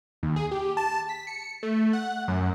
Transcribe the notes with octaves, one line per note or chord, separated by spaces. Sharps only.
D#2
G#4
G4
A5
B6
C#7
A3
F#5
F#2